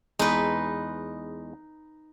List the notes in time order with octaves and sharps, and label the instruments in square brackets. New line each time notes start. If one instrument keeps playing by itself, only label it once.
[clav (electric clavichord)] E2 G#3 [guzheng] D#4 B4